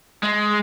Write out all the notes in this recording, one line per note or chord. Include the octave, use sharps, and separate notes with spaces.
G#3